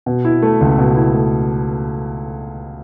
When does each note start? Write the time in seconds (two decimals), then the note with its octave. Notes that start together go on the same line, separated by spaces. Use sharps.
0.06 B2
0.25 E4
0.42 A3
0.61 C#2
0.78 B2
0.96 E4
1.14 A3